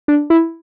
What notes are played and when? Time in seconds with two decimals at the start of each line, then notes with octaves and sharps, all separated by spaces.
0.08 D4
0.30 E4